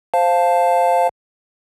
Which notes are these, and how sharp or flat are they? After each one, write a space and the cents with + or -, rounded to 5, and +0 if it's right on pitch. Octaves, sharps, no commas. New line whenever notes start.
C5 +0 F5 +0 A5 +0